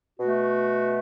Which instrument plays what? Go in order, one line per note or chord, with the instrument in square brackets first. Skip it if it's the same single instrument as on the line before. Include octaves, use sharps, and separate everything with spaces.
[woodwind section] B2 A3 F#4